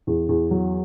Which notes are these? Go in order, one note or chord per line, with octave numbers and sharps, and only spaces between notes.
E2
E2
F#3